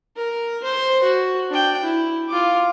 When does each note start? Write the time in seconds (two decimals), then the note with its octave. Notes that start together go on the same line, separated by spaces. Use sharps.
0.16 A#4
0.63 C5
1.03 F#4
1.50 D4 G5
1.83 E4
2.29 F4 D6